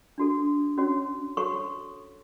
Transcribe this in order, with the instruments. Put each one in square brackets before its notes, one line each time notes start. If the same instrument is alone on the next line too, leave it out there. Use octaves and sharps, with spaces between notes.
[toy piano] D4 F#4 A4
C#4 F#4 C#5
F#4 A4 C#5 C#6